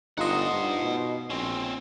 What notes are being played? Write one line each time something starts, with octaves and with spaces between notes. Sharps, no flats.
G1 D#4 F4 C5 D#5 F#5
G2
B2
A#1 C4 C#4